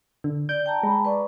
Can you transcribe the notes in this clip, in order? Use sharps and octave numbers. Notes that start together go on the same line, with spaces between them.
D3
D4 D5 G6
G5 A5 A#5
G#3 B5
B4 D5 C#6